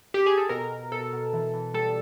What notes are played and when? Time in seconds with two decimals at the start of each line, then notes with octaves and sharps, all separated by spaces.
0.14 G4
0.26 G#4
0.38 A4
0.49 B2 A#4
0.70 B2
0.92 B2 A4
1.13 B2
1.33 E3
1.54 E3
1.74 G3 A4